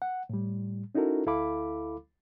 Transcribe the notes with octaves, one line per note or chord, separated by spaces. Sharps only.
F#5
A2 G3
C#4 D#4 E4 F#4 A4 A#4
D2 E4 A4 F5 B5 D6